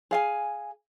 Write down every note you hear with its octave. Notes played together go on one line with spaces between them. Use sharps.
G#4 F5 G#5